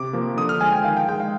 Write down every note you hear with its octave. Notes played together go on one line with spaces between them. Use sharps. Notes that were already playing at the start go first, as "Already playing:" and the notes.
Already playing: C3 D6
F3 A#3
D3 D#6
F6
F3 G#3 G#5
G5
D#3 F5
G5
G#3 G5
F5